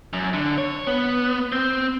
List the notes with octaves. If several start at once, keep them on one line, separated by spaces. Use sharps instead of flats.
F#2
D3
C#5
B3
C4